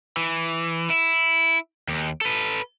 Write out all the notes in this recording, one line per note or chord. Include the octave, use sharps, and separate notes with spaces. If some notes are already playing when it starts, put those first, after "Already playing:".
E3
E4
D#2
A4 B4